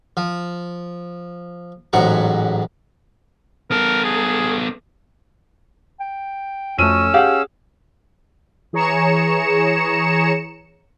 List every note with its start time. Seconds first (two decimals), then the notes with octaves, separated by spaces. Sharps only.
0.17 F3
1.93 A1 G#2 F#3 F#5 A#5
3.71 B3 A4 A#4
4.05 G#4
6.00 G5
6.78 F2 A3 C#4 F#4 E6 D#7
7.14 G4 G#4 F5 F#5
8.73 E3 G#4 C#5 A#5 C#7 E7